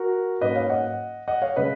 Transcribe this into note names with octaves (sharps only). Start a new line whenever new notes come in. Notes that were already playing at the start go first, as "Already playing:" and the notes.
Already playing: F#4 A#4
G#2 F#3 A#3 C#4 B4 D#5
C#5 F5
D#5 F#5
D#5 F#5
C#5 F5
C#3 G#3 B4 D#5